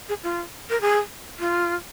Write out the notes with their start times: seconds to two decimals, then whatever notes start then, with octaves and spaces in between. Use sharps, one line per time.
0.09 G#4
0.23 F4
0.70 A#4
0.81 G#4
1.39 F4